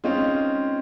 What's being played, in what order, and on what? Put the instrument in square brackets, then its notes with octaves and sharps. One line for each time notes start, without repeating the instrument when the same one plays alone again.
[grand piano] G#3 C4 C#4 D#4 F4